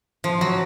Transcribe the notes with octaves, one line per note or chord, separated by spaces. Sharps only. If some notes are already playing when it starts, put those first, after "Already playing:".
F3
F#3